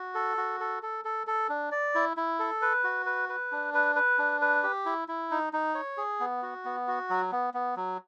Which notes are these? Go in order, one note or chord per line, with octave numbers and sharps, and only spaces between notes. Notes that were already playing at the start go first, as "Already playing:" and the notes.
Already playing: F#4
A4
F#4
A4
A4
A4
A4
D4
D5
E4
E4
A4
B4
F#4
B4
B4
D4
B4
B4
D4
B4
G4
E4
E4
D#4
D#4
C#5
G#4
B3
F#4
B3
F#4
F#3
B3
B3
F#3